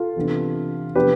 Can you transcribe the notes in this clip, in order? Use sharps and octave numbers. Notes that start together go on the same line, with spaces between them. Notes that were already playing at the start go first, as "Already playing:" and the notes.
Already playing: F4 A4
C3 E3 B3 D4
C3 F3 B3 D4 G4 B4